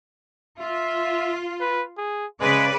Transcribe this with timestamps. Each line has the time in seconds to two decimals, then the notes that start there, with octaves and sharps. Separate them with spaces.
0.59 F4 E5
1.61 B4
1.98 G#4
2.40 C#3 G#3 B4 D5